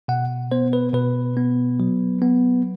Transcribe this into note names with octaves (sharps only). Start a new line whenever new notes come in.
B2 F#5
B3 C5
B4
B2 B4
B3
F#3
B3